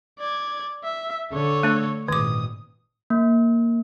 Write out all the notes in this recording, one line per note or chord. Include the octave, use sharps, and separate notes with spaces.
D5 G#6
E5
D3 A4 C#5
A3 D4
G#1 A#2 D#3 D6 D#6
A#3